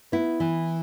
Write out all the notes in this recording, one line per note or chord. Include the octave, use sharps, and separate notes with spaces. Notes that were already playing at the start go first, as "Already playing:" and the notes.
B3 E4
E3